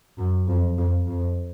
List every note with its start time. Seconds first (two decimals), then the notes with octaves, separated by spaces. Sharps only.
0.18 F#2
0.47 F2
0.78 F2
1.08 F2